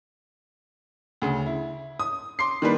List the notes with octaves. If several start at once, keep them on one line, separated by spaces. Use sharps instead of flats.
D2 C#3
E4
D#6
C6 D6 C7
D#3 G3 A#3 D4 B4